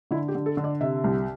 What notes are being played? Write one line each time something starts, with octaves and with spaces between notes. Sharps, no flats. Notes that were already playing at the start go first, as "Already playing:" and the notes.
D3 E4
G4
D3
A4
D3
D5
C3 E5
C2